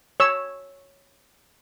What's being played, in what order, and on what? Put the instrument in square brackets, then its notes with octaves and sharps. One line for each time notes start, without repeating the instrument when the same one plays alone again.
[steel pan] C#5 E6